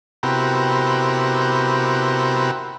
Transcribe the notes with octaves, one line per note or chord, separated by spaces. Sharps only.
C3 B3 E4 F#4 G4 A#4